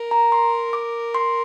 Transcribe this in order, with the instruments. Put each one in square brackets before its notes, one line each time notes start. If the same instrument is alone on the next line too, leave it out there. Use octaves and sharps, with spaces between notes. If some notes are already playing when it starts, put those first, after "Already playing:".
Already playing: [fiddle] A#4
[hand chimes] A#5
C6
D6
C6